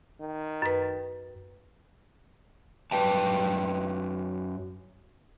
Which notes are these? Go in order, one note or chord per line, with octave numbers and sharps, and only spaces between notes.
D#3
F#2 B4
F#2 B4 G5 A5